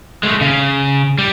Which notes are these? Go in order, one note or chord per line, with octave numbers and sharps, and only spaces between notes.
G#3 A3
C#3
G3